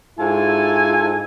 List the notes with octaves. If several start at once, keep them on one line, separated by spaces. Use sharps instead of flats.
G#2 E4 F4 A4 G#5